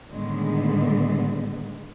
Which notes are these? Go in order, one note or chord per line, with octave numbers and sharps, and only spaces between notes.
A2 D3 D#3 G3 G#3 B3